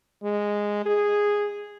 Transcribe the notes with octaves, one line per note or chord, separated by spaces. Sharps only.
G#3
G#4